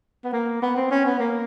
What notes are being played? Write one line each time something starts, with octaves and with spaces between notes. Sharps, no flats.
B3
A#3
B3
C4
C#4
B3
A#3